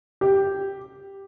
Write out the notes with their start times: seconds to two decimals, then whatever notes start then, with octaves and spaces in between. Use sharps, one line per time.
0.21 G4